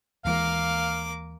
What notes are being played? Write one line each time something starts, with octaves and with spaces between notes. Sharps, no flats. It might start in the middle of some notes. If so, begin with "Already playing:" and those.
D#2 E3 G#3 A#3 F5 D6